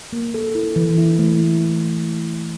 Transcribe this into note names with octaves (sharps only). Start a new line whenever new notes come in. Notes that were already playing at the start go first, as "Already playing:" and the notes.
A#3
A4
E4
E3
E4
A3